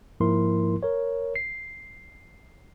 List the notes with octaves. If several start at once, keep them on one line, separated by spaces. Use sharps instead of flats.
G#2 F3 A#3 E4 A#4 C6
A#4 C#5
C7